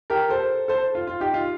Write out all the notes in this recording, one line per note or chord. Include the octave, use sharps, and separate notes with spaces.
G4 A#4
A4 C5
A4 C5
F4
F4
D#4 G4
F4